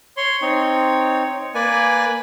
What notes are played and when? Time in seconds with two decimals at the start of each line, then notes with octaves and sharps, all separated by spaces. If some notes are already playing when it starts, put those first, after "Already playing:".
0.17 C#5 C6
0.42 C4 D#4 C#5
1.55 A#3 B4 D5 G#5